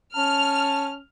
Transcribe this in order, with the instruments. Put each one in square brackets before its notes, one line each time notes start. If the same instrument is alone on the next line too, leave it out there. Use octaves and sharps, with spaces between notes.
[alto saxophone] C#4 [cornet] A5 [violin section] F6